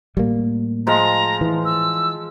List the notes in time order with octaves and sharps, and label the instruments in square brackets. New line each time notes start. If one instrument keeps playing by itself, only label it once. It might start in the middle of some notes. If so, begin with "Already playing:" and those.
[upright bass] A2 [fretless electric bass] G3 A#3
[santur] F3 G#3 F5 [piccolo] A#5
[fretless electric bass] E3
[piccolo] E6